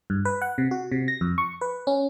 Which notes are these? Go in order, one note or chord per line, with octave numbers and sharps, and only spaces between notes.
G2
B4
F#5
C3
F#4
C3
A#6
F2
C#6
B4
C#4